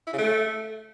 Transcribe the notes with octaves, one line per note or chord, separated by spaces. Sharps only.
E4
C#3
A3